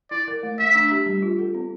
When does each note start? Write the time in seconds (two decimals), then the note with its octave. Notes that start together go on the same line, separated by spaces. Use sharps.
0.11 E4 D5
0.28 A#4
0.43 A3
0.59 A3 E5
0.75 D4
0.91 G4
1.06 G3
1.23 F4
1.39 A4
1.54 C4